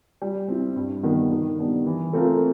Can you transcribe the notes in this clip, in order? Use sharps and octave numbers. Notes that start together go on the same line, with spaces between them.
G3
C4 E4
G2
D#3 G3 B3
D#3
G3 B3 D4
E3
A3 C4 F4 A#4